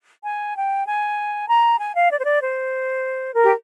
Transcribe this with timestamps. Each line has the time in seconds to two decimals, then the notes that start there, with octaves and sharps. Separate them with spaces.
0.23 G#5
0.54 G5
0.85 G#5
1.48 A#5
1.79 G#5
1.94 F5
2.10 D5
2.17 C5
2.24 D5
2.41 C5
3.35 A#4
3.43 G4